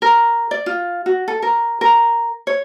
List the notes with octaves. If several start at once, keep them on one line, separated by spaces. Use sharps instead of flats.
A#4
D5
F4
F#4
A4
A#4
A#4
C#5